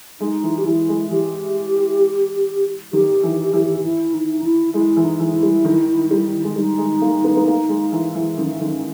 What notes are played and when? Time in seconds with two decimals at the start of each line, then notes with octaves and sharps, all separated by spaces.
0.20 G#3 D#4
0.43 E3
0.58 G4
0.66 E3 E4
0.89 G#3
1.10 E3 G4
2.93 D#3 G4
3.23 E3
3.53 E3
3.84 E4
4.14 D#4
4.44 E4
4.74 G#3 E4
4.97 E3
5.04 D#4
5.20 E3
5.35 E4
5.43 G3
5.65 D#3
6.11 G3
6.44 G#3
6.56 G3 D#4
6.78 G#3
7.01 A#3
7.24 B3
7.37 B3
7.47 A#3
7.69 G#3
7.92 E3
8.15 E3
8.38 D#3 C#4
8.61 D#3